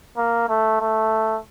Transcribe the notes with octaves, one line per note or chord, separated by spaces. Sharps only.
A#3
A3
A3